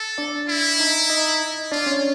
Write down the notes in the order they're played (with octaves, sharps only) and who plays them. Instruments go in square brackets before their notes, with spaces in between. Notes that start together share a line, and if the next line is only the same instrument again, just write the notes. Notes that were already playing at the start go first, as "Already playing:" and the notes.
Already playing: [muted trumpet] A4
[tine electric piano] D4 D5
[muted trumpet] E4
[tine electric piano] D#4 D#5
D#4 D#5
[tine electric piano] D4 D5 [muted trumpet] F4
[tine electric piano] C#4 C#5